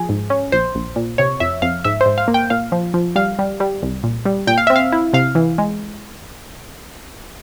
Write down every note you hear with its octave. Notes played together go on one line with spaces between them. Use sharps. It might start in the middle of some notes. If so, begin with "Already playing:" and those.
Already playing: F3 G#4
G#2
C#4
A#1 C5
A#1
A#2
C3 C#5
F2 E5
F2 F5
G#2 E5
C5
G#2
F5
A#3
G5
A#2 F5
F3
F3
G3 F5
G3
G3
C2
A#2
G3
A#2 G5
F5
C4 E5
F5
E4
C3 F5
E3
G#3